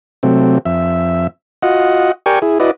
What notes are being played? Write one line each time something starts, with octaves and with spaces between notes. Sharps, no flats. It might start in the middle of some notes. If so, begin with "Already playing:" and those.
C3 F#3 A3 C4
F2 E5
F4 F#4 D#5 F#5
G4 A#4 D5 G5 G#5 C#6
E4 G#4
E4 F#4 B4 D5 D#5